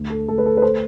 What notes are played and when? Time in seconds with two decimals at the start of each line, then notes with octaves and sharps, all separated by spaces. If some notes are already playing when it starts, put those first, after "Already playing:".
Already playing: D2
0.10 A4
0.28 D2 A4
0.38 B4
0.46 A4
0.57 B4
0.62 A4 C5